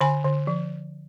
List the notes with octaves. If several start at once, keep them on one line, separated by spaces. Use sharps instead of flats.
D3 G#5 B5
D3
F3